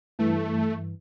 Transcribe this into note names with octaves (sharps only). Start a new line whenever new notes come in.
G2 E3 A3